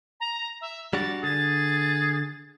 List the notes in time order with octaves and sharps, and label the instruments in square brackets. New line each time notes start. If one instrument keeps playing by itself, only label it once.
[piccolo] A#5
E5
[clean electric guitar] G3 D4 F#4 [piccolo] A6
[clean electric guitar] D3 [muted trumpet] G#4 [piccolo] A6